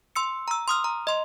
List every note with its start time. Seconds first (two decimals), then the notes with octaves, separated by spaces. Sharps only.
0.16 C6 E6 C#7
0.48 A#5 E6
0.68 C6 D#6 F6
0.84 A#5
1.07 D#5 C6